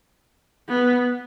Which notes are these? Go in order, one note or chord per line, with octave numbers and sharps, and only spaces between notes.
B3